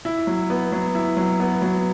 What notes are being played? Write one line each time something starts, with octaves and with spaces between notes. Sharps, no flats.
E4
F#3
B3
F#3
E4
F#3
B3
F#3